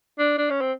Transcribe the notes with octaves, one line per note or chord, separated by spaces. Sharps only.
D4
D4
C#4
C4